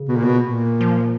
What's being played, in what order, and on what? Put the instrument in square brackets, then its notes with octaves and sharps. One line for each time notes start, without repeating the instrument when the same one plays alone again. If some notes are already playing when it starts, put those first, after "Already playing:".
Already playing: [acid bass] C#3
[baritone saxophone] B2
A#2
B2
A#2
[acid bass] F3